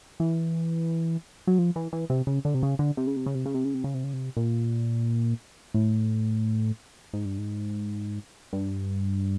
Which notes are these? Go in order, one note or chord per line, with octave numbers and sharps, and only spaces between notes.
E3
F#3
F3
E3
E3
C3
C#3
D3
C3
C#3
D3
C3
C#3
C3
C#3
C3
C#3
C3
C#3
C3
C#3
C3
C#3
C3
A#2
A2
G#2
G2
G#2
G2